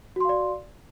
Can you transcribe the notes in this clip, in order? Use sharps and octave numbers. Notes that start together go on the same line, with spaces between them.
F#4 D5 F5 C6